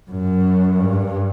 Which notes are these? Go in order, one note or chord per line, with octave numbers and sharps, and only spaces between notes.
F#2
G2